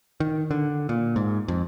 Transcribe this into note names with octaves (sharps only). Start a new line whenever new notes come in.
D#3
D3
A#2
G#2
F2